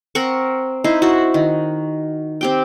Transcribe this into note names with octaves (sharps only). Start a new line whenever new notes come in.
C4 A#4 F#5 C#6
D#4 E4 C5
E4 F#4
D#3
C4 G4 G5